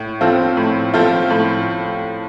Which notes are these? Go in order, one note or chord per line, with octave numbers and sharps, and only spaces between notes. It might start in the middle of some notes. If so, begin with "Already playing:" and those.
Already playing: A2
F3 C4 F4 A4
A2
F3 C4 F4 A4
A2